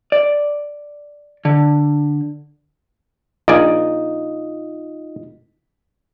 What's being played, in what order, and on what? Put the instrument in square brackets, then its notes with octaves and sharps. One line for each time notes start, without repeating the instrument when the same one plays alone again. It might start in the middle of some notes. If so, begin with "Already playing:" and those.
[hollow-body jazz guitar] D5
D3
[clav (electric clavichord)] A#1 D5 G#5 [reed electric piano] D#4 F4 D#5